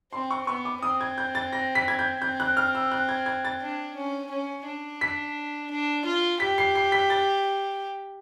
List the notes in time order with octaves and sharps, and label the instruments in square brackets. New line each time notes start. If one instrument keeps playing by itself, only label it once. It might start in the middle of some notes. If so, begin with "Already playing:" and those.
[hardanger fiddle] C4 [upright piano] C6
[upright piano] C#6
[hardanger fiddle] B3 [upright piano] C#6
[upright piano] D6
[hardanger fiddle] C4 [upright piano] D#6
[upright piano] G#6
G6
A6
A#6
B6
G#6
G6
[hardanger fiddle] C4 [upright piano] G6
[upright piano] F#6
F6
E6
F#6
G#6
G#6
A6
[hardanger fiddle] D4
C#4
C#4
D4
[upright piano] B6
[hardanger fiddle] D4
F4
[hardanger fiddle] G4 [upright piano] B6
[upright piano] C7
C7
B6
A6